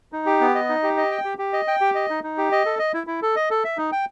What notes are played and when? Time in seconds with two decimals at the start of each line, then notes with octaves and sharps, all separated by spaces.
0.12 D#4
0.26 G4
0.41 B3
0.55 D#5
0.69 D#4
0.83 G4
0.97 D#5
1.11 G5
1.25 G4
1.39 G4
1.53 D#5
1.68 G5
1.81 G4
1.95 D#5
2.10 D#4
2.23 D#4
2.38 G4
2.52 D#5
2.65 A4
2.79 D#5
2.94 E4
3.07 E4
3.22 A4
3.36 D#5
3.50 A4
3.64 E5
3.77 D#4
3.92 G5